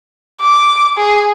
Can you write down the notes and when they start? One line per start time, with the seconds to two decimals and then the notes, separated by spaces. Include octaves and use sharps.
0.41 D6
0.98 G#4